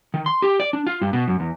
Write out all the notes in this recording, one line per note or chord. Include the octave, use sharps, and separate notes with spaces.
D#3
C6
G4
D5
D4
F4
G2
B2
F#2
E2